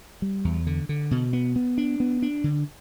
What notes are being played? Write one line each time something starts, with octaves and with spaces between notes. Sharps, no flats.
G3
E2
D3
D3
B2
B3
B3
D4
B3
D4
D3